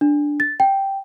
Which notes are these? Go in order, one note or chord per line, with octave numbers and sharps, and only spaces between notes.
D4
A6
G5